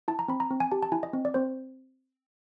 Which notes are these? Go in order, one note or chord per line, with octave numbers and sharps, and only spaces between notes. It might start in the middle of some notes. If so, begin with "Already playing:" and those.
E4 A5
A#5
C4 B5
A#5
C4
G#5
G4 A5
A5
E4 G#5
D#5
C4
D5
C4 C5